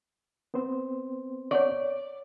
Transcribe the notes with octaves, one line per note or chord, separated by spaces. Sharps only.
B3 C4 C5
C#5 D5 F#5 C#6